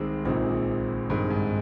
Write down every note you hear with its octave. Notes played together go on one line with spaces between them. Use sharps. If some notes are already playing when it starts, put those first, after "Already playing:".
Already playing: C2 C3 D#3 G#3 C4
A#1 A#2 D#3 G#3 C4
G2 D#3 G#3 C4
G#2